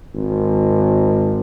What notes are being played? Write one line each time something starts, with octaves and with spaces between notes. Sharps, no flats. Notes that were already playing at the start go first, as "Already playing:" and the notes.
G#1